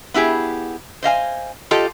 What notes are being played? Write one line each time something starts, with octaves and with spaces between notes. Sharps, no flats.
B3 E4 G4 G#4
C5 D#5 F5 G#5
F4 G4 A4 D#5